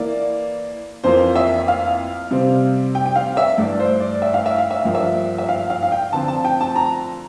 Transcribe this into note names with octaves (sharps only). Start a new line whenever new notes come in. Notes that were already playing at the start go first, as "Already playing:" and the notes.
Already playing: E3 A#3 E4 D5
F2 E3 A#3 F4 C5
E5
F5
C3 G3 C4
G5
G5
F5
E5
G2 E3 A3 D5
C5
D5
E5
F5
E5
F5
E5
G2 F3 A#3 F5
E5
E5
F5
F5
F5
G5
D3 F3 C4 F4 A5
A5
G5
A5
A#5